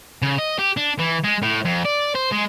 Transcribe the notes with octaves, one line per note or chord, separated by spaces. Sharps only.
C#3
D#5
G4
D4
E3
G#3
A2
F2
D5
C5
G#3